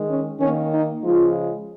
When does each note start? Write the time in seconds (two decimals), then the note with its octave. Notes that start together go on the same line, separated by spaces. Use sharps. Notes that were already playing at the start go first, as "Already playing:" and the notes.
Already playing: D#3 G#3
0.09 C#4
0.40 D#3 A#3 C#4
0.72 D#4
1.03 C#3 F3 G#3 F4